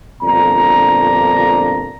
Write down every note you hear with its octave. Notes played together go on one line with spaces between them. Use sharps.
G1 F2 A#2 D4 A#5